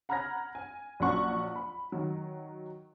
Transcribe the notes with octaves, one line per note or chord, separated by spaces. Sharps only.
F#5 A#5 B5 F6 G#6 A#6
G#5
A#1 F#3 C#4 F#5 C#6
B5
D#3 F#3